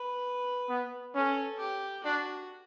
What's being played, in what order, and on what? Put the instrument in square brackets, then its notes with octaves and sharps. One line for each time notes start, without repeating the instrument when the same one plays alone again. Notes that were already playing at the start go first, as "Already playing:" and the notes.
Already playing: [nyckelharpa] B4
[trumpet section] B3
[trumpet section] C#4 [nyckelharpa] A4
[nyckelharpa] G4
[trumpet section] D4 [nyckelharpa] F#4